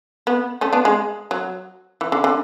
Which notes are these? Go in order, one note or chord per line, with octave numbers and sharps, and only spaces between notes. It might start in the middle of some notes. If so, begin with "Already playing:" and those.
B3
A3 C#4
B3 D4
G#3
F#3
E3
D3
D3